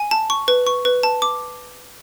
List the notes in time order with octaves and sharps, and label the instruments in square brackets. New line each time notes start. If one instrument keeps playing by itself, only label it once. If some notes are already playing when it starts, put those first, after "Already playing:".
Already playing: [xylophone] G#5
A5
C#6
B4
C#6
B4
A5
D6